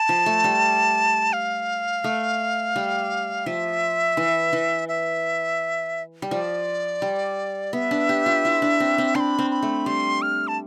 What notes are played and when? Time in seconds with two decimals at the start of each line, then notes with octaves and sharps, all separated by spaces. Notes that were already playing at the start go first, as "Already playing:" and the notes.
Already playing: A5
0.09 F3
0.26 A3
0.44 G3
1.33 F5
2.04 A3
2.76 G3
3.46 F3 E5
4.17 E3
4.53 E3
4.89 E5
6.22 G3
6.31 F3 D5
7.02 G3
7.73 B3 E5
7.91 D4
8.09 G4
8.26 F4
8.45 E4
8.62 D4
8.80 C4
8.98 C4
9.15 D4 C6
9.20 B5
9.39 C4
9.51 B5
9.62 A3
9.86 G3 C6
10.22 F6
10.48 A5